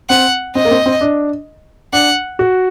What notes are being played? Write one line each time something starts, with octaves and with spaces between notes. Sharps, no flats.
C4 F#5
C4 D#5
A#3
C4
C4
D4
D4 F#5
F#4